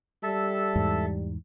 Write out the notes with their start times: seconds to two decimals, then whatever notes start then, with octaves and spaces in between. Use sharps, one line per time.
0.23 G3 A4 E5 A5
0.76 E2 G#2